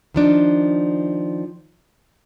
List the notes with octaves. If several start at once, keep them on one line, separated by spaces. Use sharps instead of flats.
D#3 F3 D4 D#4